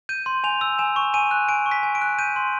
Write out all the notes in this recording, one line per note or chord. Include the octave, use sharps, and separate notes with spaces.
G6 D#7
C6
G#5 F7
E6
G#5 E7
C#6
G#5 D#7
F#6
G#5 D7
C#6
B6
G#5
D7
F#6
G6 D#7
C6